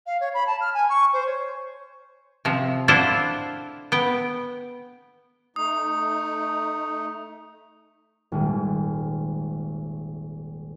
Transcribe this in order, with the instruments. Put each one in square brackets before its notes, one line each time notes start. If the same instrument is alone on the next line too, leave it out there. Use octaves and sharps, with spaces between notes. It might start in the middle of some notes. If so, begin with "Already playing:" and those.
[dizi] F5
C#5
B5
A5
F6
G#5
C#6
C5
C#5
[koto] C3 F3
D4 E4 F4 A4 C5 F#5
B3 G5
[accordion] A3 D#4 [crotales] D#6
[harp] D#1 G#1